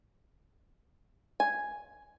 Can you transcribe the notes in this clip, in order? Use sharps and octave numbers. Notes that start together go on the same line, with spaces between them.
G#5